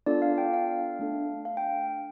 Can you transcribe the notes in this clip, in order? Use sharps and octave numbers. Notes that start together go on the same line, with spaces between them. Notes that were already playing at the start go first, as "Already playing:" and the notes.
B3 D4 F4 A4 D5
F5
G5
F5
A3 D4 A4
F5
G5